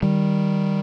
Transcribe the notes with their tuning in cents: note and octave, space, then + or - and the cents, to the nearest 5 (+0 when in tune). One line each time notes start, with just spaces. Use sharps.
D#3 +0 G3 +0